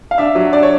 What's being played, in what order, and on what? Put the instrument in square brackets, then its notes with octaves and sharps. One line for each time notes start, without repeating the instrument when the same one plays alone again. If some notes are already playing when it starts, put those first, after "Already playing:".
[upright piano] F5
D4 E5
F#3
D4 D5
C#5